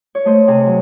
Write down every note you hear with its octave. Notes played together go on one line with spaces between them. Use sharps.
C#5
A3 C5 D#5
C3 G#4 C5
F#3